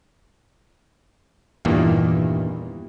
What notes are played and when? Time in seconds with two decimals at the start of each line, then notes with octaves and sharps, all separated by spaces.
1.65 E2 G2 A#2 D#3 E3 A#3